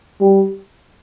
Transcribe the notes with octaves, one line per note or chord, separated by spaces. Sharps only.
G3